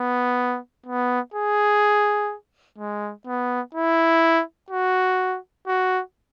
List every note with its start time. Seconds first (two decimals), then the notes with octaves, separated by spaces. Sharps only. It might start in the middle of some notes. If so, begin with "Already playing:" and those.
Already playing: B3
0.86 B3
1.34 G#4
2.78 G#3
3.27 B3
3.75 E4
4.70 F#4
5.67 F#4